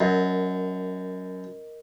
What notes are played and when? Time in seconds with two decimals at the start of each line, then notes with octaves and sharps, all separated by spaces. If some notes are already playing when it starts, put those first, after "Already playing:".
0.01 F#2 A#4 D#5